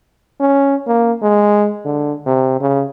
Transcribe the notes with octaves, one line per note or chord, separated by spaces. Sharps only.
C#4
A#3
G#3
D3
C3
C#3